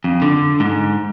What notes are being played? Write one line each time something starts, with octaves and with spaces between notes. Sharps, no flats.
F2
D3
G#2